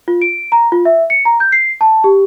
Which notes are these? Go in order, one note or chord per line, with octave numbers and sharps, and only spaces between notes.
F4
D7
A#5
F4
E5
C#7
A#5
G6
C7
A5
G4